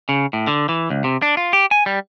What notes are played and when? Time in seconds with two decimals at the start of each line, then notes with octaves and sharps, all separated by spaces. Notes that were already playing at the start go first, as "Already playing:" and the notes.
0.09 C#3
0.33 A2
0.47 D3
0.69 E3
0.90 C#2
1.04 C3
1.22 D4
1.37 F4
1.53 G4
1.71 G#5
1.86 G3